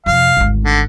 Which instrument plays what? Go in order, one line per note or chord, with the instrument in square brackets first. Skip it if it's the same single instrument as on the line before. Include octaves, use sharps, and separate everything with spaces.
[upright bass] F2 C3 [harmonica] F5
[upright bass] G#1 D2
[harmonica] D3